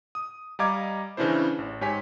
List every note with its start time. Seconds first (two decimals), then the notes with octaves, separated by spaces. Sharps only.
0.15 D#6
0.59 G3 D#5 F5 A#5 D6 G#6
1.17 C#3 E3 C#4 D4 E4 C5
1.58 A1
1.81 G#2 G4 C#5 G#5 B6